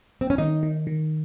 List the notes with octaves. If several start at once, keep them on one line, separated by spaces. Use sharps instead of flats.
C4
C#4
D#3 D#4
D#3
D#3